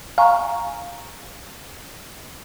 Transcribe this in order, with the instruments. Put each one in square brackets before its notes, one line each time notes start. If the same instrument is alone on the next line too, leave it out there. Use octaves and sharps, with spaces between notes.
[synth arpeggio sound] F5 [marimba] G#5 A#5 C#6